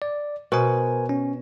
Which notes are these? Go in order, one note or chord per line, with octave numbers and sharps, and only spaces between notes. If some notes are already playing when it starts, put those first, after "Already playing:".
D5
B2 A#4 C5 G#5
C#4